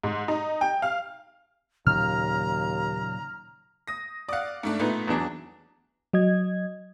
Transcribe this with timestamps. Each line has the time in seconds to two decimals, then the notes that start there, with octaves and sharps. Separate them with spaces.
0.04 G#2
0.28 D#4
0.61 G5
0.82 F5
1.87 D#2 A#2 C#3 F#3 A#5 F6
3.88 D#6 A#6
4.29 D5 F5 F#5 D#6
4.63 G#2 A3 D4
4.80 A#2 A3 B3 D#4
5.08 E2 F#3 D4
6.13 F#3 D#5 G#6